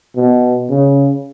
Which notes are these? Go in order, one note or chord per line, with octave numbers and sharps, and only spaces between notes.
B2
C#3